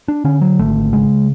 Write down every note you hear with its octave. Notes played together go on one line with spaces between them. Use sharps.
D4
D3 C#4
F#3
G#1 A3
C#3 G#3